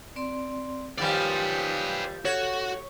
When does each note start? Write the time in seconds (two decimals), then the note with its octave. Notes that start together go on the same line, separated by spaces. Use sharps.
0.16 C4 D5 C6
0.98 D#2 F3 G3 B4 D5 F5 G5 G#5
2.25 F#4 A4 C#5